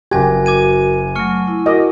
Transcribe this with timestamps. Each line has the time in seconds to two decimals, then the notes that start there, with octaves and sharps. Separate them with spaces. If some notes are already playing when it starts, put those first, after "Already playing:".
0.11 F#1 F#3 F#4 G4 A#4 G#5 G#6
0.46 D6 G#6 D#7
1.15 F#3 A3 C#6 F6 C#7
1.48 E4
1.66 F#4 A#4 D#5 D6